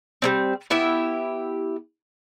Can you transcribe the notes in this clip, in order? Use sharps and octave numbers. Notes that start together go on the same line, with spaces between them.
G3 A#3 C4
B3 E4 G4 E5